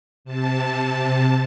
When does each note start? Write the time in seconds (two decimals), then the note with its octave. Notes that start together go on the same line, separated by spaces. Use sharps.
0.25 C3 A5